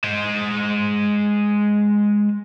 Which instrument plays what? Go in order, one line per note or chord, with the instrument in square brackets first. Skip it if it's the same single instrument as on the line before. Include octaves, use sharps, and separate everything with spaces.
[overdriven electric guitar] G#3 C5